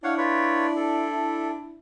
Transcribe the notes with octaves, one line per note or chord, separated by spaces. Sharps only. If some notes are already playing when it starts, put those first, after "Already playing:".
D4 E4 C#5 F5 F#5
F4 B4 C#5
A4